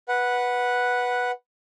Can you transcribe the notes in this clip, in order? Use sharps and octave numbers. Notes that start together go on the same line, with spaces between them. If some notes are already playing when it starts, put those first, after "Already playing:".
B4 F#5